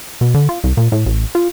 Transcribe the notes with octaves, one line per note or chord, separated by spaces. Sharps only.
B2
D3
F4
C2
A#2
A2
A1
F4